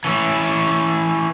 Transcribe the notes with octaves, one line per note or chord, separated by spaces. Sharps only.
E3 C#4